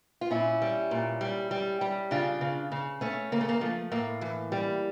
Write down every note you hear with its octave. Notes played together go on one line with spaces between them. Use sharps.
F4
A#2 C#4 E4
G3
A#2
G3
G3
G3
C#3 D4 F4
C#3
C#3
C#3 A3 C#4
C#3 A#3
A3
A#3
F3 A3
A2 A#3
E3
G3